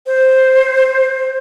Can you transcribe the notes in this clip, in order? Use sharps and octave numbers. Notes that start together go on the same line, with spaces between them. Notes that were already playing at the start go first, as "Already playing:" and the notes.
C5